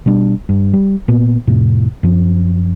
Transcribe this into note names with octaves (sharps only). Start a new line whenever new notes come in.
B2 G3 D4
G2
G3
A#2 B3
F2 A2 C3
F#2 F3